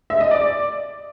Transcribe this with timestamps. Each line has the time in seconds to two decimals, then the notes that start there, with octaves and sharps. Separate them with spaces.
0.10 E5
0.21 D#5
0.31 D5